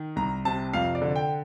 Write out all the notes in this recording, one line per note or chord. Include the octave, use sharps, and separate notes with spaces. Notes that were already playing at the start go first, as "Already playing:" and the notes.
Already playing: D#3
C2 A#5
C3 A5
F2 F5
D5
D3
G5